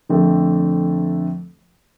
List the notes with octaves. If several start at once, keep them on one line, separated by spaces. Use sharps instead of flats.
F2 D3 A3 C4